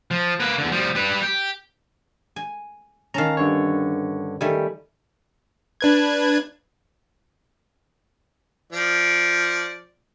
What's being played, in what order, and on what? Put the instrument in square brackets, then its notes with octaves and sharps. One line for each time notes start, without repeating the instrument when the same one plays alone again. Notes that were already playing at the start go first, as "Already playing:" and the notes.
[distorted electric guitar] F3
A#3 B4
E2 D3
F3 G3
G3 B4
G4
[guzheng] G#5
[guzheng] D#3 C#4 [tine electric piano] F5 A5 A#5
[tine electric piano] G2 D3 C#5
[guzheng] D#3 A3 G#5 [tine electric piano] G3
[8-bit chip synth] D4 B4 G#6
[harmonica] F3 D5